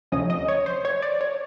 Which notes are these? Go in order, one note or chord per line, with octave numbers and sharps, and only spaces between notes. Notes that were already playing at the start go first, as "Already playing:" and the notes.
D2 C3 F3 A3 C#4 D#5
D#5
C#5
C5
C#5
D5
C#5